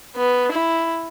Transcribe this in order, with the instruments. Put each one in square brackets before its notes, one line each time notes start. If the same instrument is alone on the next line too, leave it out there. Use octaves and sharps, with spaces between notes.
[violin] B3
E4